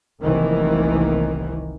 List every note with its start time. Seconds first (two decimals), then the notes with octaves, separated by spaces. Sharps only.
0.20 F1 C2 D#3 E3 A#3